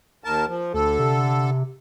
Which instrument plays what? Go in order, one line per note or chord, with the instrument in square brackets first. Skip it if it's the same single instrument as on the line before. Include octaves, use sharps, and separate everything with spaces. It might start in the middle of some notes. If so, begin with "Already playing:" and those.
[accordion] D#2 A#4 A5
F3
[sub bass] D2 [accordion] D3 A4
[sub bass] C3